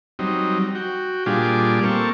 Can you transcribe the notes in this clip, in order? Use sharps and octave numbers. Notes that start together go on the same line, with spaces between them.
F#3 G3 C4 D#4
F#4 G5
A#2 G3 D4 F4 G4 G#4
A#3 C4 A4 C#6